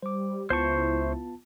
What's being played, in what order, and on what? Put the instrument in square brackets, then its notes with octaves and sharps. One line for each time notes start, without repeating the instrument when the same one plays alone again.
[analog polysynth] G3 [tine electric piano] C5 D6
[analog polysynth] C#2 E4 [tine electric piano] B3 F4 A5 [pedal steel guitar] C5 C#6